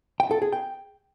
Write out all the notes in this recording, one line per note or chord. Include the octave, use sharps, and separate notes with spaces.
G5
A4
G#4
G5